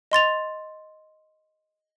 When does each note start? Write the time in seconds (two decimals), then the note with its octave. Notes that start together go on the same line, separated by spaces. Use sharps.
0.12 D#5 C6 A6 F7